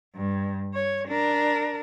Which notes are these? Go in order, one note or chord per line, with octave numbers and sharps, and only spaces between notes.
G2
C#5
D4 A#4